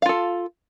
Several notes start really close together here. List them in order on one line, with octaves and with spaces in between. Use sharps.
F5 F4 A4